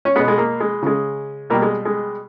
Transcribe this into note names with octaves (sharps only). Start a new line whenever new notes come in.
C#4
B2 G#3 B3
G#3
A#3
G#3
C#3 G#3
B2 G3 A#3
G#3
G#3